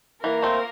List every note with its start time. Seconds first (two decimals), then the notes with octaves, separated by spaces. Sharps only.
0.23 E3 A#3 A#4
0.42 A3 C4 F4